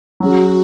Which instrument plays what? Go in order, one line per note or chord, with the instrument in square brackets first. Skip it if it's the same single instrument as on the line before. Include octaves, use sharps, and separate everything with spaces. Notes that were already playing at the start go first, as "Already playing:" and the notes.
[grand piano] F#3 C#4 G#4 [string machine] F#4